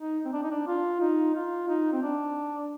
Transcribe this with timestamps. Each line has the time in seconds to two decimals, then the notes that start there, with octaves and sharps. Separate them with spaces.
0.01 D#4
0.25 C4
0.33 D4
0.43 D#4
0.51 D4
0.67 F4
1.01 D#4
1.35 F4
1.69 D#4
1.93 C4
2.03 D4